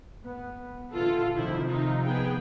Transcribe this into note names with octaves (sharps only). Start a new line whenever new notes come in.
B3
A#2 D3 E3 F4 A4
C3 D#3 F3 E4 C5
D#4 F4
B3 G#4 G5